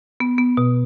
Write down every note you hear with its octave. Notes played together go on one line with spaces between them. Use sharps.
B3
B3
B2